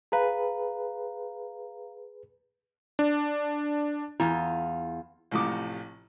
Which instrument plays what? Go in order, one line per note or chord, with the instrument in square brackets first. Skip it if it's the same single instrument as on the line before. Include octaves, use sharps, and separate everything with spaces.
[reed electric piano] G#4 B4 [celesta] F5 A#5
[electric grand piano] D4
[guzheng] E2 F4 [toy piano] E4
[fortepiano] A1 A2 C3 F3 D6